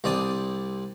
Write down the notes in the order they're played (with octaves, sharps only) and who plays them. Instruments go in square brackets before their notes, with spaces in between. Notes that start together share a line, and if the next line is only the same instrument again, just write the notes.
[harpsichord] C2 C4 D4 D5 D#6